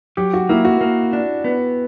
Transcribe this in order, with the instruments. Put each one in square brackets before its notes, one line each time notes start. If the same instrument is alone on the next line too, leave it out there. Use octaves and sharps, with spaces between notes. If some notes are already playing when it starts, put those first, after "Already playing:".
[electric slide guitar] F#3 [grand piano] G4
[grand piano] F#4
[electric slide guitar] A#3 [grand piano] E4
[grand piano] F#4
[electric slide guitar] A#3
D4
B3